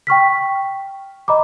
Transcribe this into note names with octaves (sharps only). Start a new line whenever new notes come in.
G5 C#6 F6 B6
D#5 A#5 B5 D6